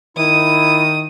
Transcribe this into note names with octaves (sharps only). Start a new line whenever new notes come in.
D#3 E4 D#6